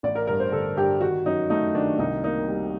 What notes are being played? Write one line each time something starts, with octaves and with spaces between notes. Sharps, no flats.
A1 D5
A#4
G2 A#4
C5
D3 A4
G2 G4
D#3 F#4
F#2 D#4
A3 D#4
D#3 D4
C2 D#4
A#3 D#4
G3